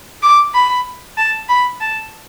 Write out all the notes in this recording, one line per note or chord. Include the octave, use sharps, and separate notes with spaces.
D6
B5
A5
B5
A5